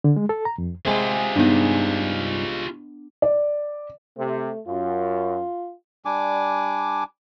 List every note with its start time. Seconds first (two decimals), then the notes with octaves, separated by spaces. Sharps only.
0.04 D3
0.16 G#3
0.29 A4
0.45 A#5
0.58 F2
0.85 C3 G#3 F4 G#4
1.36 G2 B3 D4 D#4
3.22 D5
4.18 C3 A3
4.68 F#2 F4
6.05 G3 D4 G#5 D6